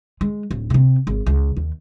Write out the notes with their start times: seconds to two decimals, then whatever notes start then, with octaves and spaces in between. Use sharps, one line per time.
0.21 G#3
0.51 D1
0.70 C3 C4
1.07 G#1
1.26 C#2
1.57 D#2